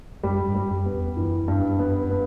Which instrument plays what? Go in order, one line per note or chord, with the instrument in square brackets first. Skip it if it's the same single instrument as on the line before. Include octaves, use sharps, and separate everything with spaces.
[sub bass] F#2 [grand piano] G3
[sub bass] G2
[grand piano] G3
[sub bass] F#2
[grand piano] B3
[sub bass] E2
[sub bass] F#2 [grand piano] E3
[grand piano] G2
B3
B3